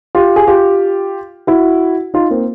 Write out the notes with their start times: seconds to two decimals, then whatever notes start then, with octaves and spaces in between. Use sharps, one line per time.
0.15 F4 G4
0.36 G#4
0.47 F4 G4
1.47 E4 F#4
2.14 D#4 F4
2.31 A#3 C4